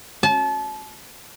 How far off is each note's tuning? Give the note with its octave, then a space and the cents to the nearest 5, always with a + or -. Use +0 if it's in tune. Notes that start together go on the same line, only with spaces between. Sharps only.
A5 -30